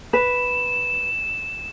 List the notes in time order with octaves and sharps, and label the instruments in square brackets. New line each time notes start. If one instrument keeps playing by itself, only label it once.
[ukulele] B4 [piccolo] E7